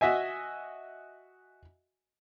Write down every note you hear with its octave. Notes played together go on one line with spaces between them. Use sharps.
F#4 D#5 E5 G#5